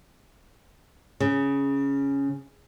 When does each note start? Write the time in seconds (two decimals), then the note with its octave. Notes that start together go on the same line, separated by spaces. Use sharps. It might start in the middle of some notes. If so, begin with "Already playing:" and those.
1.20 C#3